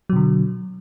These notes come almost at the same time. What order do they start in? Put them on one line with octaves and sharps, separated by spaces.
F#3 B2 D3